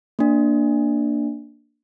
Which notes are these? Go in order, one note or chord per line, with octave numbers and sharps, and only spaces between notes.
A#3 D4